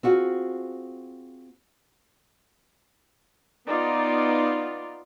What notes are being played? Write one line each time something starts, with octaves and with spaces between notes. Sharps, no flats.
C4 F4 F#4 G#4
B3 D#4 F4 D5